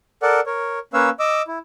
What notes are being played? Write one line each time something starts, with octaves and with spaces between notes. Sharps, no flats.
A4 A#4 D5 F#5
A#4 C#5
A#3 C#4 B4 C#5 F5 E6
D#5 D6 E6
E4